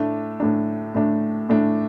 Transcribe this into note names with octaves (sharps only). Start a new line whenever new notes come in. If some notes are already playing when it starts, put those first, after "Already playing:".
Already playing: A2 A3 D4
A2 A3 D4
A2 A3 D4
A2 A3 D4